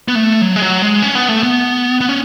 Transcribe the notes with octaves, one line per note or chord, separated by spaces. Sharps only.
B3
A3
F#3
G#3
F#3
G#3
C#4
B3
A3
B3
B3
C#4